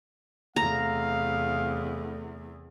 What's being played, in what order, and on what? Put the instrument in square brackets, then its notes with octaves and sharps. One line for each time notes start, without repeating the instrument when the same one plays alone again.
[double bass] E2 C3 [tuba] A3 [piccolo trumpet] F5 [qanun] A#5